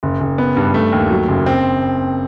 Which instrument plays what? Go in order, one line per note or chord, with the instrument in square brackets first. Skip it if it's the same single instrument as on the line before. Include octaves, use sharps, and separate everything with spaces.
[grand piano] F#1
F#1
B3
G2
A3
D#2
F#3
F#1
C4